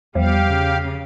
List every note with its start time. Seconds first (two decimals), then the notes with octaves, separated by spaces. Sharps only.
0.15 E2 F3 G3 G4 F5
0.45 C#3